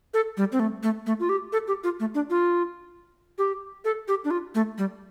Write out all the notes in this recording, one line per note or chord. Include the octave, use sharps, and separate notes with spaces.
A4
G3
C4
A3
A3
A3
F4
G4
A4
G4
F4
A3
D4
F4
G4
A4
G4
D4
F4
A3
G3